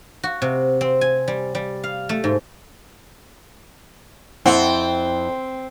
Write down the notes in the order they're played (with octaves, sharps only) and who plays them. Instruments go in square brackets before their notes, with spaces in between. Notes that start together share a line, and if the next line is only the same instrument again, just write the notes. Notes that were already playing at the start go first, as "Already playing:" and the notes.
[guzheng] F#4
C3
C4
G#5
G3
G3
F5
A3
G#2
[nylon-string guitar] F2 E4 F#5 [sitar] C4